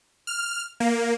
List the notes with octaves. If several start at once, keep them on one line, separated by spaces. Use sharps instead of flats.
F6
A#3